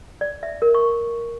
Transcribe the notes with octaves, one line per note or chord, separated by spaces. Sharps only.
D5
E5
A#4
C#6